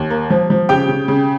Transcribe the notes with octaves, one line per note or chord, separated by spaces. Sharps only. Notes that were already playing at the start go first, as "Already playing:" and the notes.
Already playing: D#2
A#3
F3
F3
C#3 G4 G5
C#3
C#3